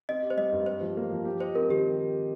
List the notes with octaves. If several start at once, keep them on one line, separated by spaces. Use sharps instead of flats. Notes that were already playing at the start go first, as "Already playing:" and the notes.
C4 D#5
G4
C5
G3 D#5
G2
G4 C5
F3
A#3
F3
G4
C5 D#5
C4 A#4
D#3 G4